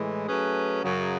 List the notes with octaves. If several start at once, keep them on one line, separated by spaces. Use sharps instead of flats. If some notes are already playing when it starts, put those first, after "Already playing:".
Already playing: A2 E3 G#3
F#3 A3 C#4 G#4 B4
F#2 C#3 F#3